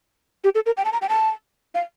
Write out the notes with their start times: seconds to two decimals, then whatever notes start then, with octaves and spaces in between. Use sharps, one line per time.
0.44 G4
0.55 A4
0.66 A#4
0.77 G5
0.85 A5
0.93 A#5
1.01 G5
1.09 A5
1.75 F5